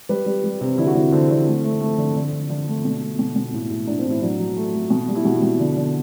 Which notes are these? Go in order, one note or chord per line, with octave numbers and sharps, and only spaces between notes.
G3 B4
G3
G3
C3
D3 E4
F#4
D3 E4
D3 C4
D3
A3
A3
A3
D3
D3
D3
D3 D4
A3
B2
A3
B2
B2
A2
A2
A2 D4
C4
A2
E4
F#3 D4
F#3
A3
A3
B2
G3
E4
B2 F#4
B2
D3
D3